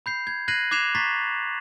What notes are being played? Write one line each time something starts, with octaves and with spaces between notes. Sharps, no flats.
B5 G6 C7
G#6
F#6 G#6 A#6 C7 D#7 F#7
D6 F#6 G#6 C7 E7 F7
A#5 C#6 A6 B6 C7